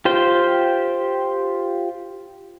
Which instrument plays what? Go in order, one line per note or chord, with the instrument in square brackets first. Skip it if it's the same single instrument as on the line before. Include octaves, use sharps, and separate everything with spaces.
[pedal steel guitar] F4 G4 C5 G5